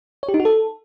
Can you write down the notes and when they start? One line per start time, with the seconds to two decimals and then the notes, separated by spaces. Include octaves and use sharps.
0.23 C#5
0.29 G4
0.34 D#4
0.40 F#4
0.45 A4